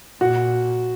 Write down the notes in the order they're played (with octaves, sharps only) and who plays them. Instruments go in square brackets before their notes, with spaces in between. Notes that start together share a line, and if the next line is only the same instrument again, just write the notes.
[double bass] A#2 [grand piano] F#4